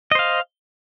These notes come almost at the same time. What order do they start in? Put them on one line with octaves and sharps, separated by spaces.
D#5 C5 F5